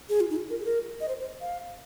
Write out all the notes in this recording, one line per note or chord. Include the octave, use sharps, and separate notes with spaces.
G#4
F4
D#4
F4
A#4
G#4
A#4
D#5
C5
C5
F5